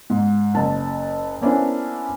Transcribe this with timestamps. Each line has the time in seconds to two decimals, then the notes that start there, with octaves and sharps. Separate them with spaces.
0.10 G#2
0.54 F#1 A5
1.41 A#3 B3 C#4 D4 E4 C5